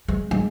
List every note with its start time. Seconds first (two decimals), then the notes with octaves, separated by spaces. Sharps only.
0.08 G#3
0.31 G#3